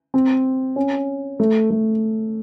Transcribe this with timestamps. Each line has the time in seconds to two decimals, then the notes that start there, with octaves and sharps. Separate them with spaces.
0.14 C4
0.76 C#4
1.40 A3
1.70 A3